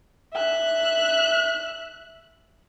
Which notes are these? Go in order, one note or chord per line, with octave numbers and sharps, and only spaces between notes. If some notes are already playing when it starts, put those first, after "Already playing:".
E5 F#6